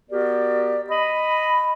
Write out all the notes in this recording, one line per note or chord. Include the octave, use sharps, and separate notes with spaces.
B3 F#4 G4 A#4 D5
D#5 B5